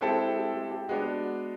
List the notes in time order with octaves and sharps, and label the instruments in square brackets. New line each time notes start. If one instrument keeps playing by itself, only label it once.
[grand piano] G#3 C4 E4 A4 [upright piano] G4
[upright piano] G4
G4
G4
G4
[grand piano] G#3 B3 D4 [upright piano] F#4